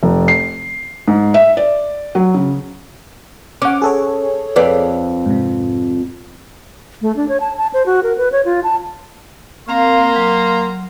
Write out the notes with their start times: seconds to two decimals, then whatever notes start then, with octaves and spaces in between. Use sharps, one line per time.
0.03 F1
0.28 C7
1.08 G#2
1.34 E5
1.57 D5
2.15 F#3
2.34 C#3
3.62 C#4 F#5 D6
3.82 G#4 A4 C#5
4.56 F2 B4 D5
5.26 G#2 C3
7.02 A3
7.16 D4
7.29 C#5
7.40 A5
7.58 A5
7.74 C5
7.86 F#4
8.03 A#4
8.18 B4
8.32 C#5
8.45 F4
8.64 A5
9.69 A#3 C4 F5 A#5 C6
10.16 F#3